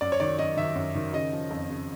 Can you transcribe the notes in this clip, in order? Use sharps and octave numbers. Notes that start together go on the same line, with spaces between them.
F#2 D5
C#5
D#3 D5
F#2 D#5
D#3 E5
F#2
D#3
C#3 D#5
F3
F2
C#3